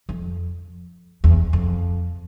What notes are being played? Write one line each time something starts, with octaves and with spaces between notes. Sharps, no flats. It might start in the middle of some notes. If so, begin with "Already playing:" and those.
F2
E2
F2